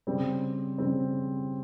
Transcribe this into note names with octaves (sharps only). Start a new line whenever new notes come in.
C#3 G3 C4
C#3 G3 C4